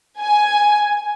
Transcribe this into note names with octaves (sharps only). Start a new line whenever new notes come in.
G#5